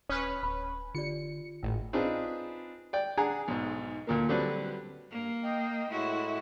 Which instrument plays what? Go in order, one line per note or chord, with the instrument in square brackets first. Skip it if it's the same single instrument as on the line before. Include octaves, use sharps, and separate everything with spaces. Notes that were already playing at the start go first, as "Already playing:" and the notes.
[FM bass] D#1 [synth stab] C#4 B4 [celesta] D#6 F6
[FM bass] D1 [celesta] B5
[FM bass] D3 [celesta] F4 G4 D5 [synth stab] C#7
[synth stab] G#1 [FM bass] A2
[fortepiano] C4 D4 D#4 F4 G#4 B4
D5 G5
D4 G#4 F#5 G#5 A#5
B1 G#2
D2 A#2 A#3
D3 F#3 G3 C4 D4 B4
[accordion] G2 [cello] A#3
[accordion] D#5 G5
[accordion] A2 G#3 A3 [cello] E4 F#4